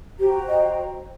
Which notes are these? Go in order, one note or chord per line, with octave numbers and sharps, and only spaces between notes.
F#4 G4 C5 G5 A#5
D#5